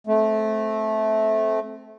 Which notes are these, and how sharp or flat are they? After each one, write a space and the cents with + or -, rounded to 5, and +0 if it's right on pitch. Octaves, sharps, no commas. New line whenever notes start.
A3 -15 C4 +0